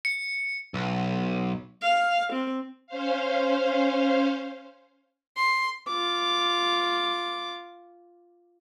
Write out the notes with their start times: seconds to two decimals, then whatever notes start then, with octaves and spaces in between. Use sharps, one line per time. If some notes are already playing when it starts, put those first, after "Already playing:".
0.05 C#7
0.74 B1
1.82 F5
2.32 C4
2.87 C#4 C5 F5
5.37 C6
5.87 F4 D6